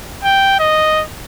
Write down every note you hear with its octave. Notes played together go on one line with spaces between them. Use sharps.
G5
D#5